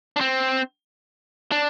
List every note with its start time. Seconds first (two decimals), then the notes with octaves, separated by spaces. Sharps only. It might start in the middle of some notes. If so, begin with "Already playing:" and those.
0.16 D4
0.21 C4
1.52 D4